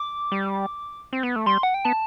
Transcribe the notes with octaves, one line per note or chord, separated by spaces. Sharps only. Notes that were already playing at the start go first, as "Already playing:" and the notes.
Already playing: D6
G3
C4
B3
A3
G3 C6
F#5
G5
B3 A5